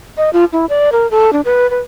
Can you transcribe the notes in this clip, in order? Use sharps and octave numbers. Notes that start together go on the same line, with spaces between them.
D#5
F4
E4
D5
A#4
A4
D4
B4
B4